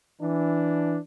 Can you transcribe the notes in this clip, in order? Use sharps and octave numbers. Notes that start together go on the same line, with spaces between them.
E3 D4